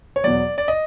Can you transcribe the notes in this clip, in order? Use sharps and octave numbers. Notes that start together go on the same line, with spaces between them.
C#5
E2 B2 F#3 D5
D5
D#5